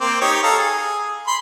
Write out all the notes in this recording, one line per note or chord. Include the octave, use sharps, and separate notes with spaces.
A#3 C4 D6
D#4 G4 C#5
A4 F5 A#5
G#4
B5 C6